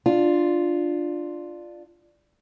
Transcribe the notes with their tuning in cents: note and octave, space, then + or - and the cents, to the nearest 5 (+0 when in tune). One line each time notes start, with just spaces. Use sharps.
D4 +10 F4 +0